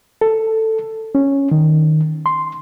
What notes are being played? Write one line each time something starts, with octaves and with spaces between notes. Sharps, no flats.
A4
C#4
D#3
C6